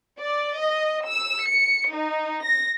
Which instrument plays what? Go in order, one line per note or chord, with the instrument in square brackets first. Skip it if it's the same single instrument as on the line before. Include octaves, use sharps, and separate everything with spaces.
[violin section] D5
D#5
E6
C#7
D#4
A#6